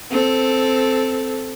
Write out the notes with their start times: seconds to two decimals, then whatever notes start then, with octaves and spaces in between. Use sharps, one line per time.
0.10 C4 A4